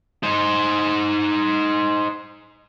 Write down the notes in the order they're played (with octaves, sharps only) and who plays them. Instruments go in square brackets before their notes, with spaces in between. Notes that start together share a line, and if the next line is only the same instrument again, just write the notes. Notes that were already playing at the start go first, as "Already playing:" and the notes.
[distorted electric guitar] D#4 C5